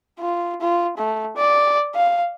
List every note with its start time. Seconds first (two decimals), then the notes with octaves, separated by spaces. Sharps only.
0.19 F4
0.61 F4
0.97 A3
1.37 D5
1.95 F5